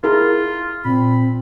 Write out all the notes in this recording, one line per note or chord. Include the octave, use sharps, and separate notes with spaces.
E4 F4 G#4 A#4
A#2 C4 B5